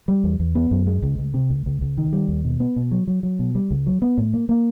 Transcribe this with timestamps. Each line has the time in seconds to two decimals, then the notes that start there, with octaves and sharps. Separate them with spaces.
0.08 G3
0.24 E2
0.40 E2
0.55 B3
0.71 F#2
0.87 G#3
1.02 C#2
1.18 C#2
1.34 C3
1.50 C#2
1.66 C#2
1.81 C#2
1.98 D#3
2.13 G3
2.28 D#2
2.45 B2
2.60 B3
2.76 B2
2.91 F#3
3.07 F#3
3.23 F#3
3.39 B2
3.55 G3
3.71 C#2
3.87 F#3
4.02 B3
4.18 A2
4.33 A#3
4.49 A#3